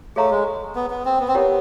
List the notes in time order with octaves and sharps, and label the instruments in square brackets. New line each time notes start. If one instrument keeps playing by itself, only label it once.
[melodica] A3 [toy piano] G#4 C#5 F5 A#5
[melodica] G#3
B3
B3
C4
B3
C4
[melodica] B3 [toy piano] E4 G4 A#4 C#5 F#5